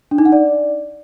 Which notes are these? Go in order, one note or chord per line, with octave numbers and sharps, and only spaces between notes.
D4
D#4
F#5
D5